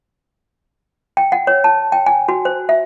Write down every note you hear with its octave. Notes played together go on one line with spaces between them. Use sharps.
G5
F#5
C#5
A5
G5
G#5
F#4
C5
E5